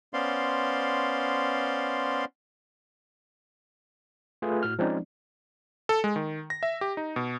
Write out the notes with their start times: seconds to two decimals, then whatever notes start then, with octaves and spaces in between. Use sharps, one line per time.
0.14 B3 C#4 C5 D5 F5 C6
4.42 A3 F4 G#4 B4
4.63 A2 F#4 F6
4.79 F3 G#3 C4 C#4 D#4 D5
5.89 A4
6.04 G#3
6.16 D#3
6.50 A#6
6.63 E5
6.81 G4
6.97 D#4
7.16 B2